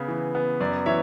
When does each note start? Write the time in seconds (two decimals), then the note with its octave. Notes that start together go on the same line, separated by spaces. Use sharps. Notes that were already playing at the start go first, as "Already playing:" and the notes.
Already playing: C#3 B3 G#5
0.08 E3
0.35 B3
0.61 F#2 D5
0.86 E3 C#5 E5